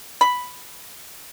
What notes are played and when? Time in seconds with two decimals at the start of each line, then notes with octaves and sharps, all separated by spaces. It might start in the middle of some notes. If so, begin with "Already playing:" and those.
0.21 B5